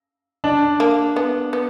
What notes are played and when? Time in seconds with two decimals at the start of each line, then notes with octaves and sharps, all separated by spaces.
0.44 D4
0.80 A#3
1.16 B3
1.53 B3